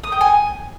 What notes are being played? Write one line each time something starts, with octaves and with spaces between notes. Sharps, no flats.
D#6
G5
G#5